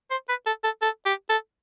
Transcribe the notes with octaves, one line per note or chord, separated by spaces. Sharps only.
C5
B4
A4
A4
A4
G4
A4